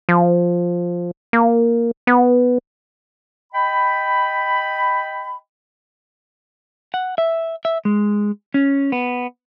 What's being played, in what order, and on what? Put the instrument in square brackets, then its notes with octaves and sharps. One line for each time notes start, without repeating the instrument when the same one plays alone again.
[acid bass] F3
A#3
B3
[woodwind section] D#5 G5 B5
[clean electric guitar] F#5
E5
E5
G#3
C#4
B3